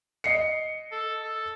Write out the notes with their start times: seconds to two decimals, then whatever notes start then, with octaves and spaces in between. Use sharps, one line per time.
0.24 D#5 C7 C#7
0.92 A4
1.24 A4